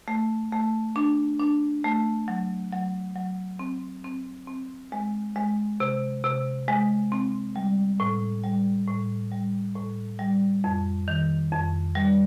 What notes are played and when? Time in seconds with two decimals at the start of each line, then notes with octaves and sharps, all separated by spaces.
0.08 A3
0.52 A3
0.96 D4
1.40 D4
1.84 A3
2.28 F#3
2.72 F#3
3.16 F#3
3.59 C4
4.05 C4
4.47 C4
4.92 G#3
5.36 G#3
5.80 C3
6.24 C3
6.68 G#3
7.12 C4
7.56 G3
8.00 A2
8.44 G3
8.87 A2
9.32 G3
9.75 A2
10.19 G3
10.64 F2
11.08 D#3
11.52 F2
11.95 G3